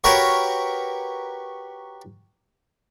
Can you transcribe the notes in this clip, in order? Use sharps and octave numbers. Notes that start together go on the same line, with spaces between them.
F#4 G4 A#4 B4 C#5 A#5